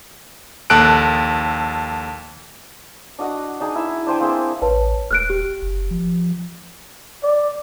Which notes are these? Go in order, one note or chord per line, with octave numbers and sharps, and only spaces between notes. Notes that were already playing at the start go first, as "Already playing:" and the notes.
A#1 D#2 A4 A5 F#6 D7
D4 F#4 D#5 F#5
D4 D#4 G#4 G#5
E4 E5
D4 C5 G5 G#5
A#3 C4 G#4 E5
A1 B4 C#5 A5
D#1 F6 F#6 D7
G4
F#1
F3
D5